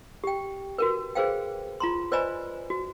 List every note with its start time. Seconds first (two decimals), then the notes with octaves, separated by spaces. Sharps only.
0.24 G4 G5
0.78 F#4 A#4 B4
1.15 G#4 B4 C5 F5 G5
1.80 F4 A#5 C6
2.12 B4 C5 D5 D#5 G#5 B5
2.70 F#4